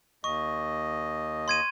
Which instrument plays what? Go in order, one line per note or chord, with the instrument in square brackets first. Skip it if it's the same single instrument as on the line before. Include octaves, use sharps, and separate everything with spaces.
[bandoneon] D#2 D#5 [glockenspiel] C#6
[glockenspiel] C6 G#6 D#7